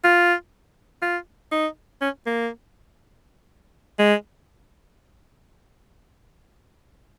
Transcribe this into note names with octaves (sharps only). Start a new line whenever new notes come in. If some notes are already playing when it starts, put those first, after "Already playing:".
F4
F4
D#4
C#4
A#3
G#3